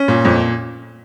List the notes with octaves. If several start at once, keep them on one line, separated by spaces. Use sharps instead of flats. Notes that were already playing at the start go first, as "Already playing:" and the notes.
Already playing: C#4
A#2
F2